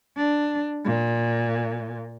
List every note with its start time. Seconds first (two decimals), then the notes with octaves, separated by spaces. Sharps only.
0.17 D4
0.85 A#2